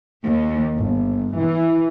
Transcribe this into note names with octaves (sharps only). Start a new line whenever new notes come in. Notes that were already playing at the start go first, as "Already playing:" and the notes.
D#2
G1
E3